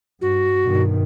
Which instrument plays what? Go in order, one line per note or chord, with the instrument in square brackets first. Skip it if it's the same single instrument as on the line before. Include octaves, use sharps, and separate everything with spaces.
[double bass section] G2 [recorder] F#4
[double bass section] G2 B2 D#3